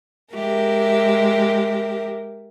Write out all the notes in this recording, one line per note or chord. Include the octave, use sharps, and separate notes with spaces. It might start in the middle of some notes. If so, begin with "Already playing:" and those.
G#3 G4 A#4 E5